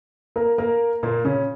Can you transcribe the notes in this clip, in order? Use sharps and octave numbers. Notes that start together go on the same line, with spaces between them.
A#3 A#4
A#3 A#4
A#2 A#3
C#3 C#4